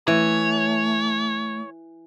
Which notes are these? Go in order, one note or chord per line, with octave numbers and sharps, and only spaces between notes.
E3 A3 C#5